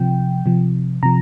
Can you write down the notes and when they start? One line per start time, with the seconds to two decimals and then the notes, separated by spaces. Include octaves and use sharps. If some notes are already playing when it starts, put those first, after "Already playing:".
Already playing: C3 F3 G5
0.46 C3 F3
1.03 C3 F3 A#5